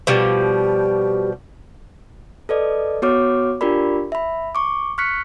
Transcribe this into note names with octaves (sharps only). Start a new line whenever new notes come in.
B2 F3 G3 G4
A4 B4 D5 D#5
B3 F#4 C#5 D6 F6
D4 F4 G4 A#4 D5 B5
E5 B5
C#6 D6
C#6 F6 F#6 B6 C#7